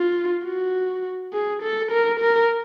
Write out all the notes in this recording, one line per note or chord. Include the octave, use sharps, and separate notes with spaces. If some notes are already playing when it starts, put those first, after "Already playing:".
Already playing: F4
F#4
G#4
A4
A#4
A#4